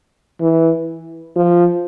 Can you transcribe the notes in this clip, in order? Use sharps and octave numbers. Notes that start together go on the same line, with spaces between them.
E3
F3